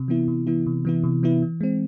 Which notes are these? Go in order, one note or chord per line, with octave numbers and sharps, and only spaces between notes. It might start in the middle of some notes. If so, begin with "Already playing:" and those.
Already playing: C3
E3 B3 E4
C3
E3 B3 E4
C3
E3 B3 E4
C3
E3 B3 E4
E3
G#3 C4